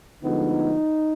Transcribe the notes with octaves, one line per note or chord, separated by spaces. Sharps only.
D2 D3 F3 G#3 B3 D#4